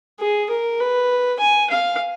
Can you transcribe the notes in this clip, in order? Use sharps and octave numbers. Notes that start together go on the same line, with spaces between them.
G#4
A#4
B4
G#5
F5